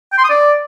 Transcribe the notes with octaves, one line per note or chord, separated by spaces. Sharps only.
G5
C6
D#6
D5